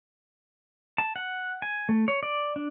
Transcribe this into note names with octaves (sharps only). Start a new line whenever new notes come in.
A5
F#5
G#5
A3
C#5
D5
D4